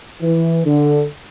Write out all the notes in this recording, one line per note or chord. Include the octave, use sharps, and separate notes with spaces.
E3
D3